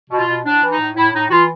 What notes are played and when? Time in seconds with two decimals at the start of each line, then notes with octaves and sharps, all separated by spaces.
0.10 B2
0.19 F4
0.27 B2
0.44 A2 D4
0.63 E3
0.71 D#4
0.79 A2
0.96 A2 E4
1.14 A2 D#4
1.27 F#4
1.31 E3 F4